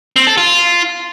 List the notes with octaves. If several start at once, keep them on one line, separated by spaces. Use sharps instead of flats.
C4
A4
F4